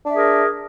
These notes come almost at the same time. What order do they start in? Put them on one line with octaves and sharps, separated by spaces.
D4 E5 G#4 A#4